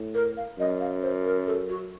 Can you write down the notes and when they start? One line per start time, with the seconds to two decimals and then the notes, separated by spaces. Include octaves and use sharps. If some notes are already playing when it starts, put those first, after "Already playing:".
Already playing: A2
0.15 A#4
0.37 F5
0.58 F#2 D#5
0.80 F5
1.02 C5
1.25 A#4
1.47 A4
1.69 F#4